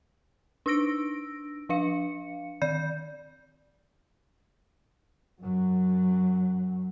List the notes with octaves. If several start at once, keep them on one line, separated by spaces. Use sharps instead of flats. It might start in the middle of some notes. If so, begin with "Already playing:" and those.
D4 D#4 E6 A#6 D7
F3 D4 F5 C#7
D#3 D5 G6
F#2 F#3